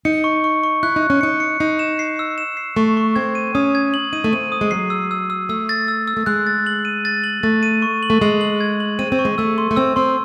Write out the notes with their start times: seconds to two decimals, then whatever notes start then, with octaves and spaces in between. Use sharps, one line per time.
0.05 D#4 C#7
0.24 C#6
0.44 C#6
0.63 C#6
0.83 E4 F#6
0.96 D#4
1.03 F#6
1.10 C#4
1.21 D#4 C#7
1.40 C#7
1.60 D#4 C7
1.79 E7
1.99 C7
2.19 E6
2.38 E7
2.57 C7
2.76 A3 C#6
2.97 C#6
3.16 C4 G#6
3.35 D#7
3.55 C#4 D#6
3.75 G#6
3.94 F#7
4.13 D#4 D#7
4.24 A3
4.33 C4 D#7
4.52 D#6
4.61 G#3
4.71 F#3 C7
4.90 E6
5.11 E6
5.30 E6
5.49 A3 E6
5.69 A6
5.88 E6
6.08 E6
6.17 A3
6.26 G#3 F#6
6.47 A6
6.66 F#7
6.85 D#7
7.05 A6
7.24 F#7
7.43 A3 A6
7.63 D#7
7.82 C#6
8.03 F#7
8.10 A3
8.21 G#3 F#7
8.41 F#7
8.61 G#6
8.80 F#7
8.99 C4 D#7
9.12 C4
9.19 C#6
9.25 G#3
9.38 A3 E6
9.58 C6
9.71 A3
9.76 C4 E6
9.96 C4 C6